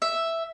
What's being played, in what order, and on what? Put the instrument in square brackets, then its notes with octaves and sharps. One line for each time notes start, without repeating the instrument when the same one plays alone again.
[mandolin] E5